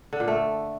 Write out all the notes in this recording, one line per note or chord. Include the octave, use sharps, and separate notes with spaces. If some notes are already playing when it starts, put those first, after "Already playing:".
D3
A#2
A3